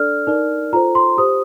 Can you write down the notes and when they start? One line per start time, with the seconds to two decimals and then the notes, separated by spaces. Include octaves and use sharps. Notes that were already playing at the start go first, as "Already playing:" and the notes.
Already playing: D4 A4 D5 F6
0.27 D#4 A#4 D5
0.73 F4 A4 C5 A#5
0.95 C6
1.18 G4 C5 D#6